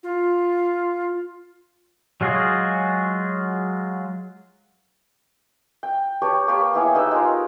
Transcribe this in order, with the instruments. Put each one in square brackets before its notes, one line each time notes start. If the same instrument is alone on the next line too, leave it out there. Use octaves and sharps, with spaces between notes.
[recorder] F4
[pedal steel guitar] F#3 G#3 F4 F#4 G#4
[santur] G5
G4 B4 C#5 A5
A#3 G4 C#5 C6
B3 E4 G#4 F5
D#4 G4 B4 E6
G#3 F4 A#4